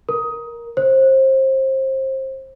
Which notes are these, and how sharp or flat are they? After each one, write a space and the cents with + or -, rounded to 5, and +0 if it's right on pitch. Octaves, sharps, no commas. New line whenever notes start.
A#4 +10
C5 +30